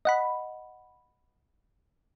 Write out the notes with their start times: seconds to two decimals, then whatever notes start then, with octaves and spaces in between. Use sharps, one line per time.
0.05 D#5 F#5 B5